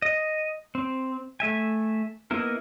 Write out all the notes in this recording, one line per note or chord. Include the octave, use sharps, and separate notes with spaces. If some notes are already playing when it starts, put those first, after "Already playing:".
D#5
C4
A3 E5 G#5
A#3 B3 D#4 E4 A#4